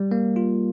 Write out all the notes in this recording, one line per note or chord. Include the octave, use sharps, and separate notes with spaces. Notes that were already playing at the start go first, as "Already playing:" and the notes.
Already playing: G3
A#3
F4